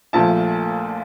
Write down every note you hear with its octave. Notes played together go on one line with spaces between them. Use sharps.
A#1 A#2 F3 A3 A5